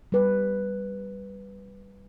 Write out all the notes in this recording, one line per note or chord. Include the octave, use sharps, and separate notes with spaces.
G3 B4